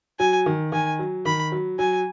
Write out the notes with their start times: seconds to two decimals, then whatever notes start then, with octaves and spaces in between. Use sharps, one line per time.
0.19 F#3 G#5
0.46 D#3
0.72 D#3 G#5
0.99 F#3
1.25 D#3 B5
1.52 F#3
1.79 F#3 G#5